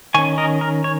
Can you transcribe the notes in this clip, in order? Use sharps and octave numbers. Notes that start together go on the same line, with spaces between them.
D#3 C#4 G#5 C#6
A#4 D#5
A#4
C#5